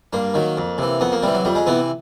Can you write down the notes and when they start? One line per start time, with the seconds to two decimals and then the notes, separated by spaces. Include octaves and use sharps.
0.13 G2 A#3
0.34 D#3 F#3
0.57 F2
0.78 C3 E3
1.00 F2 B3
1.12 A#3
1.23 C3 E3 G3
1.34 F#3
1.45 F2 G3
1.55 G#3
1.67 C3 E3 B3